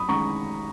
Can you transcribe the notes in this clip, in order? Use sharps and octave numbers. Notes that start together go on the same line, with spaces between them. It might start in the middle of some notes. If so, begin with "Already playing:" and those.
Already playing: F#2 B5 D#6
D#3 G#3 C#4 A#5 C#6